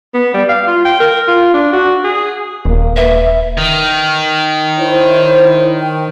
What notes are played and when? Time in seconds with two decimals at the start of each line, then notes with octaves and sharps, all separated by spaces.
0.14 B3
0.34 G3
0.49 F5
0.68 F4
0.85 G5
1.00 A#4
1.28 F4
1.54 D4
1.73 F#4
2.04 G#4
2.66 D#1 A#3
2.96 B4 E5
3.58 D#3
4.78 E4 C5 C#5
5.79 G5